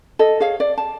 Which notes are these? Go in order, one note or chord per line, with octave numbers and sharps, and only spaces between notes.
A4 D#5
G#4 C#5 F5
D5
A5